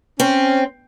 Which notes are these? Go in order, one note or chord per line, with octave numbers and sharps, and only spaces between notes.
C4 C#4